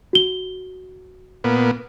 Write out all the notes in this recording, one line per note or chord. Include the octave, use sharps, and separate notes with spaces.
F#4 G7
A#2 B3